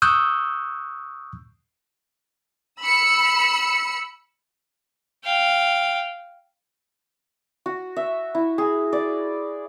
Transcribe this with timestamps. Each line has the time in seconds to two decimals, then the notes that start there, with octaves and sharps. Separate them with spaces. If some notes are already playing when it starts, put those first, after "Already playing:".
0.02 C#6 D#6 E6 F#6 G6
2.81 B5 E6 C#7
5.24 F5 G5
7.66 F#4
7.96 E5
8.35 E4
8.58 G#4
8.93 D5